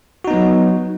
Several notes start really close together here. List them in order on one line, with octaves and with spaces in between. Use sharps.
F#4 D#4 B3 F#3